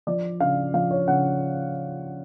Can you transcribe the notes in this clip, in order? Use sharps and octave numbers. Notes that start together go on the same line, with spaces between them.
F3 D5
C#3 F5
F3 F5
C#5
C#3 F#5